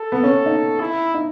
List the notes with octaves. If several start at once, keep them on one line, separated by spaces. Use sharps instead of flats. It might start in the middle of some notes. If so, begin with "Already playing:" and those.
Already playing: A4
B3
C#4
D#4
E4
D#4